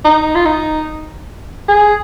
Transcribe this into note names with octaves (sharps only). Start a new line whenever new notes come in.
D#4
F4
D#4
G#4